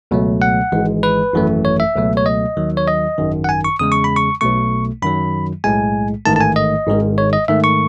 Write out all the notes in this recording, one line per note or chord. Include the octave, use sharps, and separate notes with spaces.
C#2 B2 F#3 A3
F#5
G#1 G#2 E3 G#3
B4
G#1 F#2 E3 A3
C#5
E5
C#2 B2 F#3 A3
C#5
D#5
D#2 D#3 F#3
C#5
D#5
G#1 F#2 D#3
F#5
G#5
C#6
E2 C#3 G#3 D#6
C#6
B5
C#6
B1 B2 A3 C#6
F#2 D#3 F#3 B5
B1 A2 G#3 G#5
A1 G#2 D#3 A3 A5
A5
G#5
D#5
G#1 G#2 D#3 G#3
C#5
D#5
G#2 D#3 A3 E5
C#6